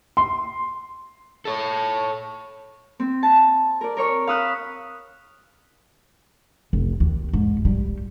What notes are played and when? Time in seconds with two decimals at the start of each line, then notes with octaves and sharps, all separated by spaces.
0.17 C6
1.45 A4 C#5
3.00 C4
3.23 A5
3.81 A#4 D5
3.97 A#4 C#5 C#6
4.27 F5 B5 D#6 E6 F#6
6.73 F1
7.00 D#2
7.33 G#2
7.65 G3